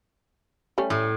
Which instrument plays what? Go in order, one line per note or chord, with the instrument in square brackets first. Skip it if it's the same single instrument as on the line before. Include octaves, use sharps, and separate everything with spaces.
[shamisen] G3 A3 C#4
[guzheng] A2